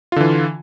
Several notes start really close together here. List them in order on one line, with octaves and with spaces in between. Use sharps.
F4 D3 E3